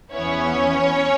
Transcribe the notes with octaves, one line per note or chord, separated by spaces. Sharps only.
E2 E3 B3 C#4 E4 C#5